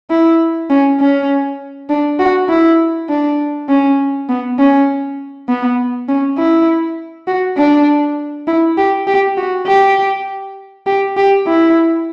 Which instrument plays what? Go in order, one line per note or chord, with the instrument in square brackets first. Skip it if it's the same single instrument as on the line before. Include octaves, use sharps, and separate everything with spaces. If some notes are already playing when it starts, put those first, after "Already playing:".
[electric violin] E4
C#4
C#4
D4
F#4
E4
D4
C#4
B3
C#4
B3
C#4
E4
F#4
D4
E4
G4
G4
F#4
G4
G4
G4
E4